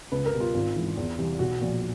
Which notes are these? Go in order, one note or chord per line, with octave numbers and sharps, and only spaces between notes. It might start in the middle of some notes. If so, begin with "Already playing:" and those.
C#2 B4
A#4
B2 G3
F4
G#1 F4
G#2 E3
E2
C3 E3 G3
B1 F#4
A#2 F3